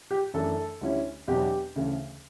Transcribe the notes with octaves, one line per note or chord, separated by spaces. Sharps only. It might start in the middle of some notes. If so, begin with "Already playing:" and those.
G4
F#2 E3 A3 D4 A4
D2 D3 G3 C#4 E4
E2 B2 F#3 B3 D4 G4
D2 C#3 E3 A3